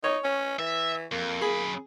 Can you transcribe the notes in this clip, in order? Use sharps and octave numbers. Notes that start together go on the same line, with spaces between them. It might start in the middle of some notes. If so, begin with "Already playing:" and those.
D#4 C#5
C#4
E3 E5
F2 A#3
F#2 G#4 B5